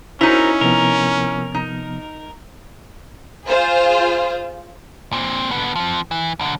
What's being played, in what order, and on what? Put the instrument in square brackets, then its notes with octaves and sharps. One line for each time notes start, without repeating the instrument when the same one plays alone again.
[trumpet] C#4 [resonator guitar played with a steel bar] D#4 E4 [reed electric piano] F#4 C5 [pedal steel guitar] A#4
[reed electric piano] C3 F3 B3 [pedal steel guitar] A#4
[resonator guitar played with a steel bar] D#4
[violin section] F4 G#4 C5
[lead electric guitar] A#2 C4
D3 B3
F3 C4
E3
B1 D3